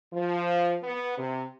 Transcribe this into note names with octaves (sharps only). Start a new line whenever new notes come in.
F3
B3
C3